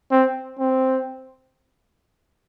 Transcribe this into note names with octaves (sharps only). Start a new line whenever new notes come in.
C4
C4